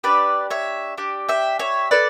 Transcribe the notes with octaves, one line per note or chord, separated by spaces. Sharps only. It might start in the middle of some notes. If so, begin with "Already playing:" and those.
D4 G4 B4 D5
C#5 E5
D4 G4
E5 G5
C#5 E5
E4 A4 B4 D5